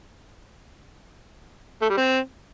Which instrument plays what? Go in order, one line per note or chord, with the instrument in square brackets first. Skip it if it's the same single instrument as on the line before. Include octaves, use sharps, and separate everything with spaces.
[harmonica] A3
G3
C4